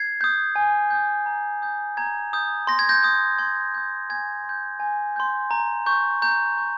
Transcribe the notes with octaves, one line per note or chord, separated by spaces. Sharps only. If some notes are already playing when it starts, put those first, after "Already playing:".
Already playing: G#6 C7
D#6 G6
G#5
D#6 G6
A#5
D#6 G6
A#5 G#6
D#6 G6
C6 A#6
G#6
G6 A#6
D#6 G6
C6 G#6
D#6 G6
G#5 G#6
C6
G6
G#5
C6 G6
A#5
C#6 G6
A#5 G6
C#6 G6